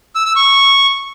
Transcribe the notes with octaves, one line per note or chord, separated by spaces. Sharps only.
E6
E6
C#6